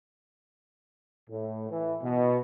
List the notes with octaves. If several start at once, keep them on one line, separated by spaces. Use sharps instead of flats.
A2
E3
B2